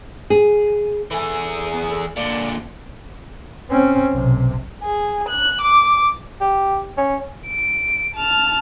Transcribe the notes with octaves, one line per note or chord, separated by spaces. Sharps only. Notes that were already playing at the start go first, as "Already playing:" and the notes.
G#4
E3 G#4 A4
B3
A4
A#2 D3 D5
C4 C#4
B1 C3
G#4
F#6
D6
G4
C#4
D7
A5 F6